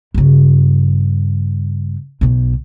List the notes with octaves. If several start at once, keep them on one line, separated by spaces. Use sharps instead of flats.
G2 C#3
B1 B2